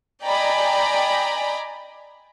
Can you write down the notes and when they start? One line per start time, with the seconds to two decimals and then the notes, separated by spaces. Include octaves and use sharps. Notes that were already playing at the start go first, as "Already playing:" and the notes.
0.24 D5 D#5 G5 G#5 A#5 B5